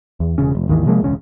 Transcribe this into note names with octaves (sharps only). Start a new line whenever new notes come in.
E2
E1 C#3 C#4
F1
G#1 D#2 D#3 E3
C3 F3 G#3 A#3
E1 C#2 C#4